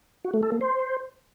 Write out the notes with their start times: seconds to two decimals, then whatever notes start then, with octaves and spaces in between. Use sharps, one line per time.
0.25 F#4
0.34 A3
0.43 A4
0.52 A#3
0.61 C5